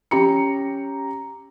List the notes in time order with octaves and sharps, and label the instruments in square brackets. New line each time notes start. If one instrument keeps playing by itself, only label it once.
[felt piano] C#4 G4 A#5 C#7